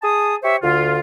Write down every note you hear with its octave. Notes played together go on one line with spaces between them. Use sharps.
G#4 A5 D#6
G4 C5 C#5 E5
D2 D3 F4